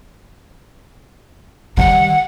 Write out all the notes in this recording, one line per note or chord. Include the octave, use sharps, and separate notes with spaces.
D#3 G3 F#5